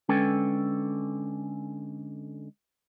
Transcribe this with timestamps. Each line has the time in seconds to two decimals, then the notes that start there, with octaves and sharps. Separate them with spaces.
0.09 D3 G#3 C#4 A4 B4 G5